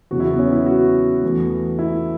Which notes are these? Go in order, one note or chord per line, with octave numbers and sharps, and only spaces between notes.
E2 C#3 F#3 F#4
E4
B3
C#4
E4
F#4
E2 E3 A3
E4